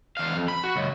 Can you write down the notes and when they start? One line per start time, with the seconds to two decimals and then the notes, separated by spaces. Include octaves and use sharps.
0.17 E2 F5
0.36 F2
0.48 B5
0.64 F#4
0.76 C#2 F#2